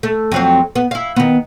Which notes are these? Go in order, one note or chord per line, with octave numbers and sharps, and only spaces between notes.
A3
F2 F#3 C4
B3
E4 F5
D#3 B3